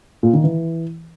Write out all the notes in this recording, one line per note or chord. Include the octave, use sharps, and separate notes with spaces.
A#2
D#3
E3